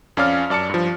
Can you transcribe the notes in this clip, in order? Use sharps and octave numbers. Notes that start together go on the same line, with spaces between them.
F2 C#4 D5 F5 D6 F6
F#2 D5 A5 D6 C#7
G2 F3